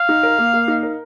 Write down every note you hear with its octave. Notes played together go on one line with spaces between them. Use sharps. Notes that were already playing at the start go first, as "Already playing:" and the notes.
Already playing: F5
D#4
A#4
A#3
A#3
D#4
A#4